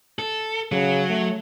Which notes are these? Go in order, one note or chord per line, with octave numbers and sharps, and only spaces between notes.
A4
C#3 F#3
A3